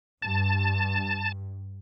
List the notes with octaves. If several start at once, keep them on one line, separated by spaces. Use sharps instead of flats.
G2 A5